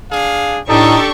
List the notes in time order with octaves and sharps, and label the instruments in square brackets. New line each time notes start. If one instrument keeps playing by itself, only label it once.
[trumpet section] D4 G#4 F5
[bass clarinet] A2 [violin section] D4 C#6 [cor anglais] D#4 [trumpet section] G4 A4